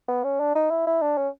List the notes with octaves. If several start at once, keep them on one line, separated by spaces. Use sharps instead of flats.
B3
C#4
D4
D#4
E4
E4
D4
C#4